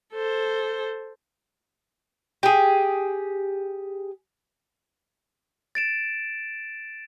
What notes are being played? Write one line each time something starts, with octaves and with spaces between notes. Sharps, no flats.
A4 C5
G4 G#4
A6 D7 E7